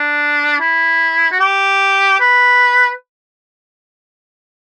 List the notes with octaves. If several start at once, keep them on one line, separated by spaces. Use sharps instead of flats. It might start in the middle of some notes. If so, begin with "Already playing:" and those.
Already playing: D4
E4
F#4
G4
B4